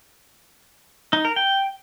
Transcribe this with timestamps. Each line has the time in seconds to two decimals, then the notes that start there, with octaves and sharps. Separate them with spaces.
1.13 D#4
1.25 A#4
1.36 G5